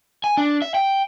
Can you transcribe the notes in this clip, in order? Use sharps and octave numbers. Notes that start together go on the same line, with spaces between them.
G#5
D4
E5
G5